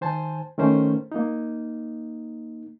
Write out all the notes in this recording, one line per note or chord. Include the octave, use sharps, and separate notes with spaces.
D#3 C5 G#5 A5
D#3 A3 C#4 A#4 C5
A#3 D#4